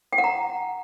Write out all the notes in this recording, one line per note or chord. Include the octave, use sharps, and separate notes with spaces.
G5
F#5
A#5